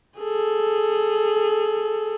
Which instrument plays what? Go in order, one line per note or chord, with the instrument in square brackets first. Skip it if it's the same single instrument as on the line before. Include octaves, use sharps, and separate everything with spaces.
[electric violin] G#4 A4